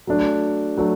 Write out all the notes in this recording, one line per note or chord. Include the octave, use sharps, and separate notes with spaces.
F#3 A3 D4
F#3 A3 D4